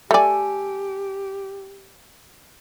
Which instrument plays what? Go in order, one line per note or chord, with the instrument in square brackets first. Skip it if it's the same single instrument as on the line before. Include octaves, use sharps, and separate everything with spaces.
[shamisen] A3 D5 [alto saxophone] G4 [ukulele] A4 G#5